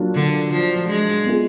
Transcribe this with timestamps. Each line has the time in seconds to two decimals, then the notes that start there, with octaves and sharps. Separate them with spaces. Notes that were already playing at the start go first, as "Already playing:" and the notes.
Already playing: F#3 A#3 D4 F4
0.15 D3
0.52 F3
0.89 G#3
1.26 B3 F4 G#4